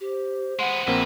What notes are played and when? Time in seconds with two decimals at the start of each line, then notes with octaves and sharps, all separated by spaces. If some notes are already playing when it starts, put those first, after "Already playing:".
0.01 G4 C5
0.59 G#3 B3 F#5
0.87 A#1 A#3 C4 B4 E5